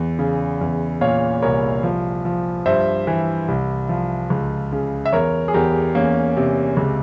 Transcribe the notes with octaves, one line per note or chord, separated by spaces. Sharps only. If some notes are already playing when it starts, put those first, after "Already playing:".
Already playing: E2
C#3
E2
A#2 C#5 F5
C2 A#4 C#5
F3
F3
G2 C5 E5
E3
C2
F3
C#2
C#3
E5
E2 A#4 C#5
G#4
E2 G4 A#4
E2 A#3 C#4
C3
C#2